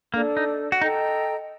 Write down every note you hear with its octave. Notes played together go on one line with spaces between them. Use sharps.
A#3 D4 A4 D5
D#4
F#4
D#4 A4 D#5 G5 A#5